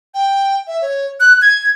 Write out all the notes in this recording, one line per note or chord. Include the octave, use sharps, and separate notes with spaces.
G5
E5
C#5
F#6
G#6